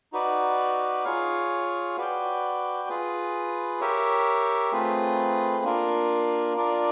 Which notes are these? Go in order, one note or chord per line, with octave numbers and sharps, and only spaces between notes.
D#4 F#4 B4 D5
F4 G#4 C#5 F5
F#4 B4 D5 G5
F4 G#4 B4
G4 A#4 C#5 E5
A3 C4 F4 G#4 B4
A#3 D4 F4 A#4
D4 F4 A#4 D5